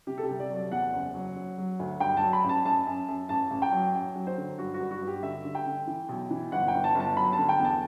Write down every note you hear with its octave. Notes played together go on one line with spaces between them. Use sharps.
C3 G4
A4
G4
C2
D5
F#3
D5
E2 F#5
F#1
F#3
F#3
F#3
D2
G2 G5
A5
F#3
B5
A1
A5
F#2 A5
F#2
F#2
A1 A5
A1
G5
F#3
F#2
F#3
C5
D3
G2 F#4
F#4
G2
F#4
G2
G4
D3 E5
D3
G5
D3
E3
B1
E3
G1 F#5
G5
G1
A5
G1 A5
F#3 B5
A5
D3
G5
E2
A5